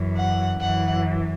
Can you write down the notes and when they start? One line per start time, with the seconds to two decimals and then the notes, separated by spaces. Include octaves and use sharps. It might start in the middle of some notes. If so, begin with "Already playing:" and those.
Already playing: F#2 E3
0.16 F#5
0.60 F#2 E3 F#5